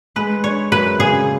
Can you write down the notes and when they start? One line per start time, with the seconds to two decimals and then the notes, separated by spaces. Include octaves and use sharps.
0.16 G#3 B4
0.44 D4 C#5
0.72 F#2 B4
0.99 C#3 G#4